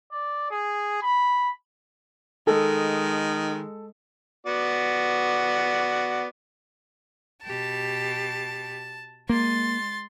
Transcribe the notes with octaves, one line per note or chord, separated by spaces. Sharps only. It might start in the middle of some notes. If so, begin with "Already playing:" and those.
D5
G#4
B5
D#3 G#3 A4
B3 F#4 D5
B2 G4 A5
G#3 A#3 C6 A6